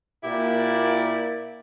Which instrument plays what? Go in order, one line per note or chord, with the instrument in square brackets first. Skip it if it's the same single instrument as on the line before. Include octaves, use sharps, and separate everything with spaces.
[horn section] A#2 A#3 E4 G4 D5